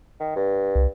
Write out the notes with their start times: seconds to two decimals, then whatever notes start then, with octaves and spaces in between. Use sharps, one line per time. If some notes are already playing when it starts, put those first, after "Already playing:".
0.20 D#3
0.36 G2
0.75 C2